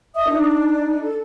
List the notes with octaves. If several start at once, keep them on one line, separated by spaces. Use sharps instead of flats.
D#5 E5 D#6
D4 D#4
A4